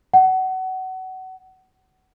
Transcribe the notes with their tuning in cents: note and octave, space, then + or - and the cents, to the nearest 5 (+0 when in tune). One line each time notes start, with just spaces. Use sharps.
F#5 +25